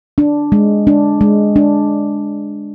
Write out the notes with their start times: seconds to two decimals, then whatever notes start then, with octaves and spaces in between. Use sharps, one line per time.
0.18 D4
0.52 G#3
0.87 D4
1.21 G#3
1.56 D4